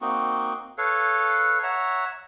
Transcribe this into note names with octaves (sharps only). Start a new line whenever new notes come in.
A#3 C4 D#4 F#4
A4 B4 C#5 F5
C#5 E5 F#5 A#5